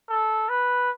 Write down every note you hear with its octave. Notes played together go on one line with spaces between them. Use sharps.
A4
B4